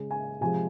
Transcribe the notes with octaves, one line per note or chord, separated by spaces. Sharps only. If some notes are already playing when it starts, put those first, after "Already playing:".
Already playing: C#3 G#3
G#5
C3 F3 G#3 G#5